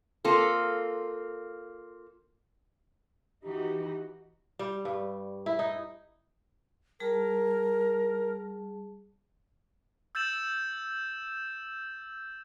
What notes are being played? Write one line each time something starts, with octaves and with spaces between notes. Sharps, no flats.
A#3 C4 F4 A4
E3 D#4 F#4 G4
G3
G2
E4
D#4
G3 G#4 A#4 A5
E6 G6 A6 E7 F#7